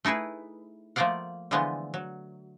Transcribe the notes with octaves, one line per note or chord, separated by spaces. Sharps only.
A3 D#4 E4 G#4 B4
F3 A3 A#3 D5 F5 F#5
D3 E3 F3 G#3 A3 B3
F#3